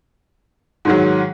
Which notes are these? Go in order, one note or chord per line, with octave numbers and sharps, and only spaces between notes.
G#2 D#3 F#3